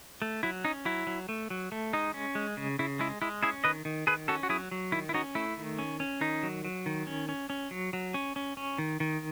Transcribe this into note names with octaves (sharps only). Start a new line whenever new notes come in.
A3
F#3 E4
C#4 D#4
F#3 E4
F#3
A3
F#3
A3
G#3 D#4
C#4
G#3
C#3
C#3 E4
G#3 E4
G#3 E4
C#4 E4 G#4
D#3 B4 D#5
D#3
D#3 G#4 B4
C#4 F#4 A4
F#4
F#3 E4 G#4
F#3
D#3 E4
E4
C#4 D#4 F#4
A3 E4
D#3
C#4
C#4
D#3 D#4
F#3
F#3
D#3
C#4
C#4
C#4
F#3
F#3
C#4
C#4
C#4
D#3
D#3